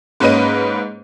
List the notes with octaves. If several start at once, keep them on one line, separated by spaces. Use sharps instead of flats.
G#2 A#3 C#4 B4 D#5 D#7